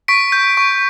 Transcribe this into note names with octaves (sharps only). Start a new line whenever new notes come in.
C#6 B6 D7
G6
C#6